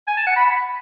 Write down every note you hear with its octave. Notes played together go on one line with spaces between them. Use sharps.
G#5
A5
F#5
B5